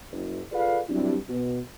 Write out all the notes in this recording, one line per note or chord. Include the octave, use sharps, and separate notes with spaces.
F#1
F4 G#4 A4 B4 D5 F5
G2 F#3 C4 D4 E4 G4
B2